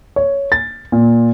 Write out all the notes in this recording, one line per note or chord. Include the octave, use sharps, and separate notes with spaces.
C#5
A6
A#2